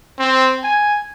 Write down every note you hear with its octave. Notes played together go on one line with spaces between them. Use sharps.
C4
G#5